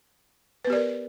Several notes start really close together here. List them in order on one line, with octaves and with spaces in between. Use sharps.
B4 B3 G4 D5 A#4